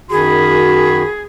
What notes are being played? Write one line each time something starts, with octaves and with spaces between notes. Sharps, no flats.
F#2 D#3 F#4 G#4 B5